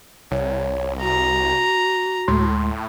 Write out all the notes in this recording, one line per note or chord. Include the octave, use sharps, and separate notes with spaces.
C2 C#5
F#4 A#5
D2 A2 G#3 C6